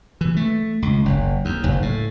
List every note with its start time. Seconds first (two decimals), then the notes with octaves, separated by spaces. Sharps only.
0.21 E3
0.36 A3
0.82 C#2
1.05 F#1
1.45 D#2
1.64 F#1
1.82 A2